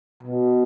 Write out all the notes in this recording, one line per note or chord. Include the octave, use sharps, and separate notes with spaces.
B2